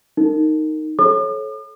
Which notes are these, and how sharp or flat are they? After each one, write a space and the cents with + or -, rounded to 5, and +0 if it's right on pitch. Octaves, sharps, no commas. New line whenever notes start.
D#4 +0 A#4 -30
A4 -30 C#5 -25 D6 +45